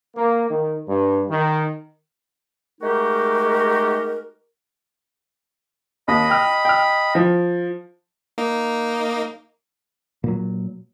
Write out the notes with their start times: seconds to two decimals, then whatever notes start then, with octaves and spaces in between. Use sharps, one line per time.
0.16 A#3
0.49 D#3
0.87 G2
1.28 D#3
2.81 G#3 A3 D#4 F#4 G4 A#4
6.08 D#2 D#5 B5
6.30 G5 F6
6.65 G5 F6
7.15 F3
8.38 A#3 D#4
10.24 A#2 F#3